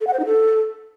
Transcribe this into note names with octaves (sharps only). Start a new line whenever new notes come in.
A4
F#5
C5
D#4
A4